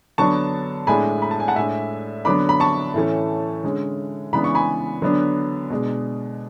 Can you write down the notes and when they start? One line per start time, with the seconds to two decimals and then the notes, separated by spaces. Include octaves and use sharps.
0.18 D3 F#3 B3 D4 A5 C#6
0.87 A2 G#3 D4 G#5 B5
1.22 B5
1.31 A5
1.40 G#5
1.48 F#5 A5
1.56 A2 G#3 D4 E5 G#5
2.25 D3 F#3 B3 D4 B5 D6
2.49 B5
2.60 A5 C#6
2.94 A2 E3 A3 C#4
3.64 D3 G#3 C#4
4.33 C#3 E3 G#3 B3 D4 B5
4.44 C#6
4.55 G#5 B5
5.02 D3 F#3 B3 D4
5.70 B2 G#3 D4